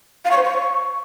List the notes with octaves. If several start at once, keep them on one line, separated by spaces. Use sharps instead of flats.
F5
C#6
C5
C#6